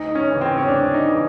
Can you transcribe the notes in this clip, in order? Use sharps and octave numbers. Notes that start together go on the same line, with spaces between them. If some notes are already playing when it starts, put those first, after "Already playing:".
Already playing: D2 D#4
C#4
C#3 E3
C4
C#4
D2 D4
D#4
C#3 E3